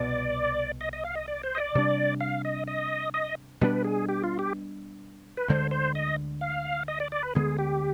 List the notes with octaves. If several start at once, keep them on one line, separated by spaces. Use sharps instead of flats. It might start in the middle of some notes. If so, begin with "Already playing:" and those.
Already playing: C2 B2 B3 D5
D#5
D#5
F5
D#5
D5
C5
D#5
D5
C3 G3 D4
F5
D#5
D#5
D#5
B2 G3 B3 D4 B4
G#4
G4
F4
G4
B4
D2 D3 G#3 C5
C5
D#5
F5
D#5
D5
D5
B4
D2 D3 G#3 B3 G#4
G4